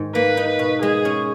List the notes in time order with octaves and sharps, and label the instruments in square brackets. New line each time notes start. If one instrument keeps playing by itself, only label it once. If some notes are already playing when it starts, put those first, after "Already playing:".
Already playing: [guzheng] G#2 D#3
[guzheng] A#3 [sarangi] B4
[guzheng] D#4
[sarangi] B4
[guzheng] B2
[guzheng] G#3 [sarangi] G#4
[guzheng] C#4